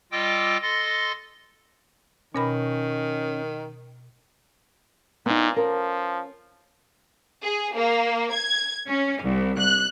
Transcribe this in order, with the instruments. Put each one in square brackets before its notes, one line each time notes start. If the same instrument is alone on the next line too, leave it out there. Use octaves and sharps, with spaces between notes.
[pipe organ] G3 F4 D#5 G5 D6 E6
A4 D#5 C6 A6 A#6
[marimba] B2 A#4 B5 [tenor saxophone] D#3 [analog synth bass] C#4
[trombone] A#2 [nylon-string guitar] B3 D#4
[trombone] F3 [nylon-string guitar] C#4 A#4
[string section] G#4
A#3
G#6
C#4
C2
F#6